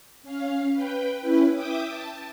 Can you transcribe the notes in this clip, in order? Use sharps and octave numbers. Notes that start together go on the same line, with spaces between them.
C#4 F5
B4 G5
C#4 E4 B4
E5 G5 D6 D#6
A5